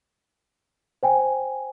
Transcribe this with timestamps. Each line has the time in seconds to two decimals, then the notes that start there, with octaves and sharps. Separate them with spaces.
1.03 C5 G5 G#5